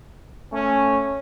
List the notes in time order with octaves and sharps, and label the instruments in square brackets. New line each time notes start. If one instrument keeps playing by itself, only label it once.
[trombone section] A3 C#4